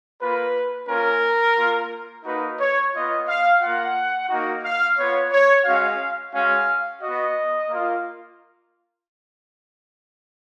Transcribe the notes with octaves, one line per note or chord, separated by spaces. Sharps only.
A#3 F4 B4
A#3 C#4 F4 A#4
A#3 F4
A#3 D#4 F#4 B4
C#5
B3 F4 D#5
F5
A#3 F4 F#5
A#3 D#4 F#4
F5
B3 F4 C#5
C#5
G#3 C#4 F#4 F5
G#3 C#4 F#4 F5
B3 F#4 D#5
A#3 F4